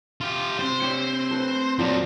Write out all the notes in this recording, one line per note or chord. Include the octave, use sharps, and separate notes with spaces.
F4 G4
C3 C5 G5
C4 G4 C#5
A3 B4
F2 A#2 F3 F#3